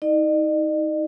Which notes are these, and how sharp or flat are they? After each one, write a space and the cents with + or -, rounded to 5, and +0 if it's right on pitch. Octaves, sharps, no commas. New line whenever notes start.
D#4 +30 D#5 -45